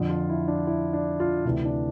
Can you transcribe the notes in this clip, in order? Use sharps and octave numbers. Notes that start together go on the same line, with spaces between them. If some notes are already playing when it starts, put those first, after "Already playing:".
Already playing: F2 D3 F3
F4
E4
D4
E4
D4
F4
D2 C3 E3 D4
D4